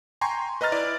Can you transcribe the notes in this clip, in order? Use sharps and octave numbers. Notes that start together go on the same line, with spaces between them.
G5 G#5 A#5 C6 C#6
B4 D#5 A#5 F6 A6
E4 D5